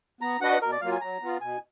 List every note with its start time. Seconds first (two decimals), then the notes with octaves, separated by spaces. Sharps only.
0.21 B3 A#5
0.41 D4 F#4 B4 D#5 F#5
0.61 B2 A#4
0.72 D5
0.81 F#3 A#3 F4 F5
0.92 G#5
1.01 F#3 A#5
1.22 B3 F4
1.41 B2 G#5